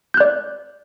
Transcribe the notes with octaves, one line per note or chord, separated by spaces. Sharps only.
D5 F#6 G6